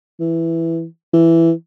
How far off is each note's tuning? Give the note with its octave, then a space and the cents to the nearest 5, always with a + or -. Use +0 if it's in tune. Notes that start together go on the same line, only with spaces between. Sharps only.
E3 +5
E3 +5